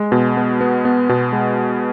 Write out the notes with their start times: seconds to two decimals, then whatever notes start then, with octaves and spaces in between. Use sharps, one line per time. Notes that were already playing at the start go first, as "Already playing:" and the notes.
Already playing: G#3
0.12 B2
0.37 B3
0.61 B3
0.85 B3
1.09 B2
1.33 G#3